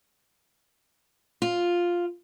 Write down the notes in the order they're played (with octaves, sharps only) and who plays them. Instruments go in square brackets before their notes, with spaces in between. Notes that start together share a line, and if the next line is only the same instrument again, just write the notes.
[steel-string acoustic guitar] F4